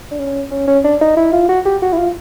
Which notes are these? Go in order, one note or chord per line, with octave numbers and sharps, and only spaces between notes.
D4
C#4
C#4
C#4
D4
D#4
E4
F4
F#4
G4
F#4
E4
F4